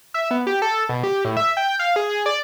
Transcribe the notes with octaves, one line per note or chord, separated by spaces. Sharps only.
E5
B3
G4
A4
B2
G4
A2
E5
G5
F5
G#4
D5